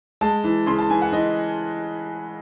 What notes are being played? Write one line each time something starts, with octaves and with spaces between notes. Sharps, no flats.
G#3 A5
E3
C#3 C6
A5
E3 G#5
F#5
E3 D#5